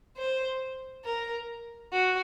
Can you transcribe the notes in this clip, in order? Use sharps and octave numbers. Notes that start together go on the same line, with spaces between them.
C5
A#4
F#4